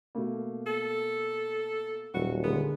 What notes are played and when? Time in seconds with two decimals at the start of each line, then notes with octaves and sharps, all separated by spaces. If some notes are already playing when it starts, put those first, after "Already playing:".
0.15 B2 A3 A#3
0.66 A4
2.14 D#1 F#3 F#4
2.44 D3 G#3 B3 A#4